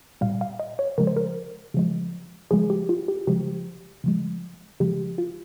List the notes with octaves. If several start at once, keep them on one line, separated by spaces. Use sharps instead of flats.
A#2 G3 F5
F5
D#5
C#5
C#3 F3 G#3 A#4
C5
A#4
C#3 F3 G#3
C#3 F3 G#3 G#4
G4
F4
G4
C#3 F3 G#3 G4
C#3 F3 G#3
C#3 F3 G#3 G4
F4